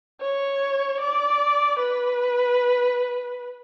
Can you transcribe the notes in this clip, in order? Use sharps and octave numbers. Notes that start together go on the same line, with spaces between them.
C#5
D5
B4